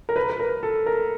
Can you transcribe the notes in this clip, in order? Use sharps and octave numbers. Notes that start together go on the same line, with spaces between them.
A#4
B4
B4
A#4
A4
A#4